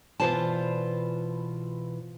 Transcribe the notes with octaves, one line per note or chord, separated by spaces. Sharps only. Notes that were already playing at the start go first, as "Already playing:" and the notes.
B2 E3 F4 C5 D5 A5